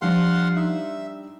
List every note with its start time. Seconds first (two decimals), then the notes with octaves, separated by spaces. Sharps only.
0.02 F3 G3 D4 F5 F#5 C6
0.56 D#4 E5 D#6 E7